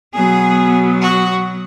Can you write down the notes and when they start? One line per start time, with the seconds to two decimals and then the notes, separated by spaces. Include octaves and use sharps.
0.14 B2 F#3 B3 G#4
1.02 F#4